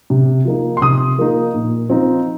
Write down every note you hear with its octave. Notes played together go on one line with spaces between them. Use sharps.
C3
F3 A#3 D#4
C6
C3 D#6
F3 A#3 D#4
A#2
F3 C4 D#4